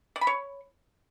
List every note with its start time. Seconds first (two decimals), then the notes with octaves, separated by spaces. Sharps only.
0.16 D5
0.21 B5
0.27 C#5